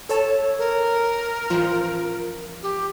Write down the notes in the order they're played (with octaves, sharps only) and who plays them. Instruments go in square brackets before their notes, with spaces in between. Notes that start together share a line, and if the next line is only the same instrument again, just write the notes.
[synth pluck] A4 C#5 A5
[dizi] A#4
[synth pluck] A1 F3 F4
[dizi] G4